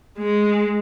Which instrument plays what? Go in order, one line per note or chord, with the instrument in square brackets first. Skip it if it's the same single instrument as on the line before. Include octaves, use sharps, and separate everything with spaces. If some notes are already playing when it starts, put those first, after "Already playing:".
[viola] G#3